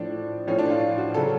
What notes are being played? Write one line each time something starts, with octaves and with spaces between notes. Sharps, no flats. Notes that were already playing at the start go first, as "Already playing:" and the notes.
Already playing: A2 F3 D4
A2 F3 C#4
D4
F4
F#4
C#3 F#3 A4